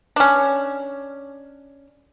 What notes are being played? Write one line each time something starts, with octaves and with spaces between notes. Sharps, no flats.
C#4 D4